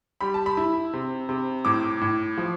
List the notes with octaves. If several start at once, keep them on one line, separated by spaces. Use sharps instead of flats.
G3 B5
A5
B5
E4
C3
C3
A2 D6
A2
F3